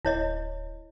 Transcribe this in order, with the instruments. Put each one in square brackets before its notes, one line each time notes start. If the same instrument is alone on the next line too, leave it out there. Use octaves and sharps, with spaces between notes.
[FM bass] D1 [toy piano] E4 C#5 D#5